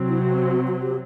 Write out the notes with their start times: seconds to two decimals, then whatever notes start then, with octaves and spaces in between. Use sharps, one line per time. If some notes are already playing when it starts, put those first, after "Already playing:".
Already playing: C3 F#3 C4
0.09 E4
0.23 F#4
0.68 F#4
0.82 G4